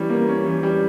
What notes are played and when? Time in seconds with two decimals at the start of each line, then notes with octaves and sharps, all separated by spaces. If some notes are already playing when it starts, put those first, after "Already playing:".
Already playing: E3 G3 C#4
0.10 A#3
0.28 C#4
0.45 E3
0.63 G3